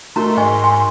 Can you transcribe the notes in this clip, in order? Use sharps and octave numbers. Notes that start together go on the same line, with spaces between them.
A3 D#4 F#4 A#4 A#5 C6
G#2 D#5 G#5 C#6
G#5